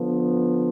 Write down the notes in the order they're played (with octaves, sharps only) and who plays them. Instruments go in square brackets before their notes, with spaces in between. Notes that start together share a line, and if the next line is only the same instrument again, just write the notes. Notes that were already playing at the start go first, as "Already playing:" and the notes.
Already playing: [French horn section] D3 F3 B3